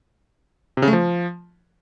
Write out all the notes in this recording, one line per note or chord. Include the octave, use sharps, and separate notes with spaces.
C3
C#3
A3
F3